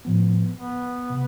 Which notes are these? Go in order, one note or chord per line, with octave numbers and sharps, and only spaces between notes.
A2 F3 B3
B3
C3